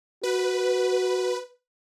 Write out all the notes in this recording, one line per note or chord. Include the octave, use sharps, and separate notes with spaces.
F#4 B4